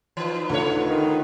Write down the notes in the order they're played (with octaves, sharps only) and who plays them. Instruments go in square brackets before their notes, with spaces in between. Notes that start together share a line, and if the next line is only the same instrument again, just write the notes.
[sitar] E3 [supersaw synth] D#4 F4 B4
[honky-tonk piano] D2 [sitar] A3 C#5
[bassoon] D#3